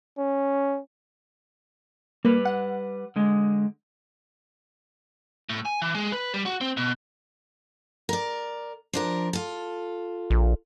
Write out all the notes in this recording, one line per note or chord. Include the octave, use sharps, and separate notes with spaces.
C#4
G3 A#3 B4
F#5
D3 G#3
A2
G#5
E3
G#3
B4
G3
F#4
C4
B2
A#4 D5
F3 D4 A#4
F4 A4
A#1